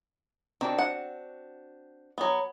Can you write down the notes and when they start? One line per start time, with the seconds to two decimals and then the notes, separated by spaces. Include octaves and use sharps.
0.61 D#3 C4 D4 F#4
0.79 F#5
2.18 F#3 B3